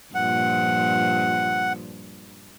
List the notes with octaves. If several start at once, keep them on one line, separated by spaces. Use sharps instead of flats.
G2 A#2 F3 F#5